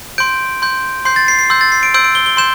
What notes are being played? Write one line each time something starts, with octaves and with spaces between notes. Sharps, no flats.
C6 G6 D7
C6 G6
C6 G6 C7
A6
C7
C7
C6 E6 G6
A6
C7
D7
C6 E6 G6 D7
D7
G7
G7
C6 G6 E7